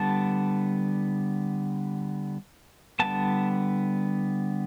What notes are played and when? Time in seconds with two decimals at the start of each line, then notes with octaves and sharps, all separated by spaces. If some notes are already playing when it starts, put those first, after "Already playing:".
Already playing: D3 G3 B3 A5
3.00 D3 G3 B3 A5